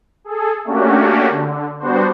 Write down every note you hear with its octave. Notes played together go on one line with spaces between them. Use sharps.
G#4 A4
A3 A#3 C#4 D4 F#4 G4
D3
G3 B3 D4 F#4 C5